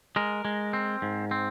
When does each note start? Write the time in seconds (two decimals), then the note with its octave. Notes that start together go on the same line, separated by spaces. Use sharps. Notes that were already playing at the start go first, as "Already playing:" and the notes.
0.16 G#3 A#4
0.45 G#3
0.73 C4
1.02 G#2
1.31 C4